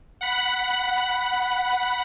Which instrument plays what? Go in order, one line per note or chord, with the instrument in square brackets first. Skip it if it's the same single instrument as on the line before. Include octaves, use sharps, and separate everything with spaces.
[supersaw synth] F#5 B5